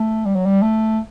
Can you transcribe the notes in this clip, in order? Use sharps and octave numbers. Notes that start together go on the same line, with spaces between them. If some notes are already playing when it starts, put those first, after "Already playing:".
Already playing: A3
G3
F#3
G3
A3